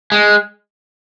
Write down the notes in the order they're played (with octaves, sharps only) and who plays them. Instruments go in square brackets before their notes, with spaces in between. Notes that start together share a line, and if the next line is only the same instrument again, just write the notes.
[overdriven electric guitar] G#3